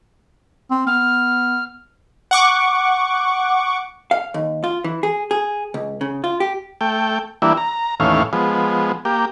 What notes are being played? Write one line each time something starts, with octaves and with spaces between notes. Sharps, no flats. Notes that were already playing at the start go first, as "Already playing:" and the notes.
C4
B3 F6
F#5 C#6 D6
F5
D#2
F4
E3
G#4
G#4
C#2
C#3
F4
G4
A3 G5
E3 G3 A#3 D4 E4
A#5
D#2 A2 E3 C#4 F5
F3 G#3 B3
A#3 G4